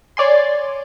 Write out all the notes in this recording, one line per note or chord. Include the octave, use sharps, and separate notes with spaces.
C#5 D5 G#5 C6